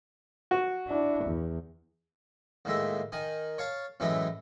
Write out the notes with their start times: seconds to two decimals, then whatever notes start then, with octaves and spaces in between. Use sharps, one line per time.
0.51 F#4
0.88 D4 E4
1.25 E2
2.65 D#2 A2 G#3 E5
3.12 D#3 G#5 D#6
3.58 C#5 F5 A5
4.00 F#2 A2 E3 G#3 A3 E5